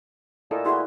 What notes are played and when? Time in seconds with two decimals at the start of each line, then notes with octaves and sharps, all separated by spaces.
0.51 A#2 E4 A4 D#5
0.66 E4 F#4 G#4 C6